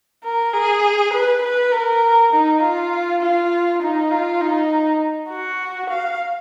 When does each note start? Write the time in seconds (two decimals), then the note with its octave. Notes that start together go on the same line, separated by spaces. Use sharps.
0.24 A#4
0.53 G#4
1.13 B4
1.42 B4
1.72 A#4
2.33 D#4
2.62 F4
3.22 F4
3.82 D#4
4.11 F4
4.41 D#4
5.30 F#4
5.90 F5